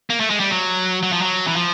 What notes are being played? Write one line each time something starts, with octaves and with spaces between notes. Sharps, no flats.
A#3
A3
G#3
G3
F#3
F#3
F3
F#3
E3
F3